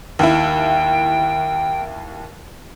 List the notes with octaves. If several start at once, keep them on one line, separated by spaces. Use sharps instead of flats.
D#2 E4 G5